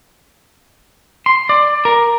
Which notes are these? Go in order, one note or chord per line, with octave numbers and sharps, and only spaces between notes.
C6
D5
A#4